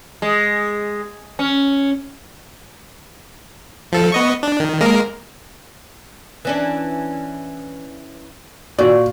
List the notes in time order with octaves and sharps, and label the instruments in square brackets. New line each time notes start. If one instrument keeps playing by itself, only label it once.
[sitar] G#3
C#4
[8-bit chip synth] F3 A4
B3 D#5 C#6
D4
D#3
G#3 A#3 A#4
[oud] E3 C#4 D4
[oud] A#2 D5 [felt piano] F#4